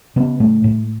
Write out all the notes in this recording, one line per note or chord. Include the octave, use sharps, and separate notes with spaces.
C#3 B3
A2 A3
A2